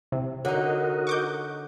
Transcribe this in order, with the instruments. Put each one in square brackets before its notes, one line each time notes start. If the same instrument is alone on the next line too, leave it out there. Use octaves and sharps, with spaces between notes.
[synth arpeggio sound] C3 [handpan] E4
[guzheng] D3 D#4 [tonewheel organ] F#4 A#4 D#5 [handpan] C#5 F#5
[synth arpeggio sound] C#6 D6 G6